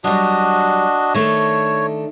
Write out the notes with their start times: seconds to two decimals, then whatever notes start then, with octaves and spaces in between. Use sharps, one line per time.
0.04 F#3 G3 D4 F#4 D#5
1.14 D#3 A3 D4 C#5